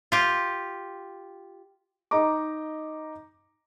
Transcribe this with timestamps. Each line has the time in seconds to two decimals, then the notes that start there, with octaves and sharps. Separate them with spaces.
0.12 F4 G4
2.11 D#4 D#5 A#5 D6